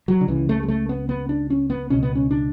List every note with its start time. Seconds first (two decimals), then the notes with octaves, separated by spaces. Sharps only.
0.08 F#3
0.21 D3
0.28 C#2 C#3 E3
0.49 A3
0.63 G#3
0.68 A3
0.89 B3
1.09 B3
1.29 D4
1.50 C#4
1.70 B3
1.90 C#2 B2 C#4
2.03 B3
2.15 C#4
2.31 D4